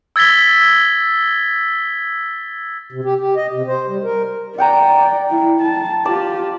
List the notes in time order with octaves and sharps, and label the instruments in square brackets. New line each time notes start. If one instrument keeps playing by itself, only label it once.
[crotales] E6 G#6 A6 B6 G7
[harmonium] C3
G4
G4
D#5
C3
C5
G3
A#4
[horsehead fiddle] D5 [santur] F#5 G5 A#5
[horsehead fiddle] E4
A5
[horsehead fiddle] F4 G4 [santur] D5 A5